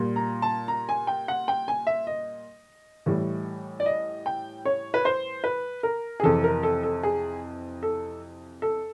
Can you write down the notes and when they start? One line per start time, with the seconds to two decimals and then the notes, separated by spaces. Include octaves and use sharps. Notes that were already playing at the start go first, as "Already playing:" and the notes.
Already playing: A#2 G3
0.16 A#5
0.42 A5
0.68 A#5
0.89 G#5
1.07 G5
1.28 F#5
1.48 G5
1.68 G#5
1.87 E5
2.07 D#5
3.06 A2 E3 G3
3.80 D5
3.86 D#5
4.26 G5
4.65 C#5
4.94 B4
5.05 C5
5.44 B4
5.83 A#4
6.20 G#4
6.23 F2 C3 E3 A4
6.44 A#4
6.63 A4
6.83 A4
7.03 G#4
7.83 A4
8.62 A4